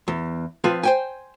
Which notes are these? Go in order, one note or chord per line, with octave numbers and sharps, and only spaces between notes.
E2
F3 C4 F4 B4
C5 G5 G#5